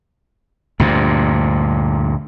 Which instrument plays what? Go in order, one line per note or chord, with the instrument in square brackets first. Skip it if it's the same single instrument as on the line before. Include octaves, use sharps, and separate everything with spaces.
[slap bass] D2 G2 A#2